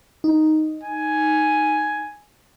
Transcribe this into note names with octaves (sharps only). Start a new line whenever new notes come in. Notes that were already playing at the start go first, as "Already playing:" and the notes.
D#4
G#5